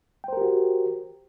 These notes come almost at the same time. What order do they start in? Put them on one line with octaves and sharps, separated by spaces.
G5 C5 A#4 G4 F#4